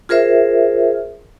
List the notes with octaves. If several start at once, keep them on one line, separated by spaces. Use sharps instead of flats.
F4 G#4 A#4 C5 E5